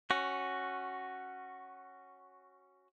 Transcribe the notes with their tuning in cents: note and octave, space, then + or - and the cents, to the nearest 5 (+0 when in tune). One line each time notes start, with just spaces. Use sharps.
C#4 -10 F#4 +5